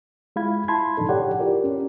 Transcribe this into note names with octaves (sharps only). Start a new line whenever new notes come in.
G#3 E4 F4 F5 B5 G#6
E4 A5 B5 C6 G#6
A2 C#3 F3 D4 D#4 A4
G4 A4 C#5 D5 F#5 G5
E4 F4 G4 A#4 D5
C#4